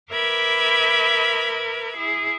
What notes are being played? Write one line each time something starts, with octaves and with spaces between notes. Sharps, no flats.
A#4 B4 E5 B5 D6 G#6
E4 G#4